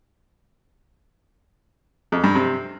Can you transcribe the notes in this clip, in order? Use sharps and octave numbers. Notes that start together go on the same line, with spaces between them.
F2
G2
C3